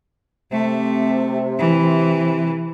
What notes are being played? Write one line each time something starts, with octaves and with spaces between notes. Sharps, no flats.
C3 A3
E3